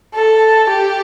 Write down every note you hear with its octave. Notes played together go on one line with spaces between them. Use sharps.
A4
G4